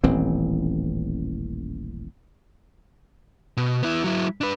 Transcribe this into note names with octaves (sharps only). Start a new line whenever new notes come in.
D#1 A1 E3 C4
B2
B3 E4
F#3 E4
D4 B4